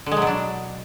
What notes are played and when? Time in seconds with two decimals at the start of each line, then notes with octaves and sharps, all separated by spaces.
0.06 D3
0.12 G#3
0.17 F#3
0.22 B2
0.27 D4